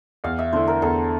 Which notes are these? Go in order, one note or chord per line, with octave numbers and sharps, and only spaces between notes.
E2 F5
E5
D3 A3 E4 C5
A#4
E2 A4